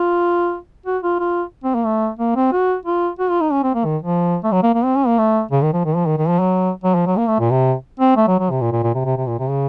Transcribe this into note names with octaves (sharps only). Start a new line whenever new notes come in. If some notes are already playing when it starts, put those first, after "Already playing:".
Already playing: F4
F#4
F4
F4
C4
A#3
A3
A#3
C4
F#4
F4
F#4
F4
D#4
C#4
C4
A#3
D#3
F3
A3
F#3
A#3
A#3
C4
C#4
A#3
A3
C#3
D#3
F3
D#3
F3
D#3
D#3
F3
F#3
F#3
F3
F#3
A#3
A3
A#2
C3
C4
A3
F#3
F#3
C3
A#2
A#2
A#2
C3
C3
C3
A#2
C3
C#3